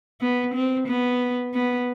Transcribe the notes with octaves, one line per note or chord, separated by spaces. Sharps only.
B3
C4
B3
B3